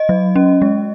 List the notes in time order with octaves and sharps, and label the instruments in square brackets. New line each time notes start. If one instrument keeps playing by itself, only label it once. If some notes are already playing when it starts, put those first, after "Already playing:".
Already playing: [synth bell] D#5
F#3
C#4
G#3